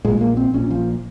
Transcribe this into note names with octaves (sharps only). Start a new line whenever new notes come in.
A#1 A#2 G#3
A#3
C4
A#1 A#2 C#4
F3